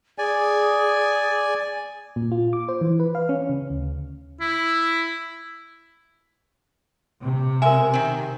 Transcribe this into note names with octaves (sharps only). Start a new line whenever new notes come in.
G#4 D5 G#5
A#2
F4
D6
C5
E3
B4
F5
C#4
C#3
D2
E4
C3
G#3 A#4 E5 G#5
D#3 C4